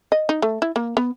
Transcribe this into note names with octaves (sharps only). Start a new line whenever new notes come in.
D#5
D#4
A3
E4
A#3
B3